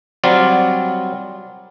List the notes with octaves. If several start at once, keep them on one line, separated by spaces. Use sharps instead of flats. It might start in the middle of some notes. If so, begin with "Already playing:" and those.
F#3 G3 C4 F4 D5